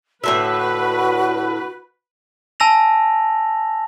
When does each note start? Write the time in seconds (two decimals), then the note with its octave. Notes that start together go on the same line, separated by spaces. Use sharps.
0.24 A2 D3 F#4 B4 E5
2.60 G#5 A5 E6 A#6 F7